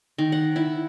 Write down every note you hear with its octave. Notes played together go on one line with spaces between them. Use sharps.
D#3
F#5
E4